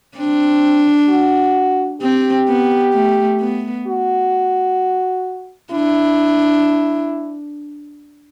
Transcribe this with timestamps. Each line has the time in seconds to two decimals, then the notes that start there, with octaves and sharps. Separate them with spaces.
0.17 C4 D4
1.09 F#4
2.01 C4 G4
2.48 B3
2.94 A3
3.40 B3
3.87 F#4
5.72 D4 E4